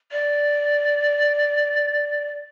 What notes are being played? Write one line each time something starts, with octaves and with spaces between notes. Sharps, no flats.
D5